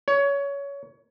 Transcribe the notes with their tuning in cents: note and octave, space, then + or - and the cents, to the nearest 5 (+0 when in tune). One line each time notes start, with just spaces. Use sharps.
C#5 +20